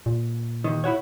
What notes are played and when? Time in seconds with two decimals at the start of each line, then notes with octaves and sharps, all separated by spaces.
0.06 A#2
0.64 D#2 D#3
0.84 E4 F#4 C#5